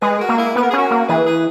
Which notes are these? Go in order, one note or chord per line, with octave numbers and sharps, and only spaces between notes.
G#3 G#4 B4
F#4 A#4
A#3
E4 G#4
B3 B4
A#4
G#4
C#4 F#4 A#4
A#3
E3 G#4 B4
G#4 B4